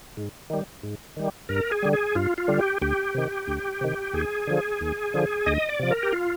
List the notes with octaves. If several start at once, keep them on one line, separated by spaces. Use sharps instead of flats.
G#2
D#3 G3
G#2
D#3 G3
G2 A#4
G#4
D3 G3
G#4
G2 F4
F4
D3 G3
G4
D2 G4
C3 D#3
D2
C3 D#3
D#2 G#4
D3 F3
D#2
D3 F3
D2 D#5
D5
C3 F3
A#4
G4
F4